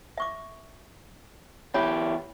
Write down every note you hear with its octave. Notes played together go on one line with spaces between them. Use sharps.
E5 C#6 D6
E2 E4 G4 C#5 B5